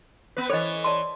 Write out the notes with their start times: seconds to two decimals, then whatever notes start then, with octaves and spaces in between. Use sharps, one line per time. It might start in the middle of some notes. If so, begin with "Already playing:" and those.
0.37 B3 B4
0.49 E3 A4 C5 C#5 D#5
0.84 D5 A5 C6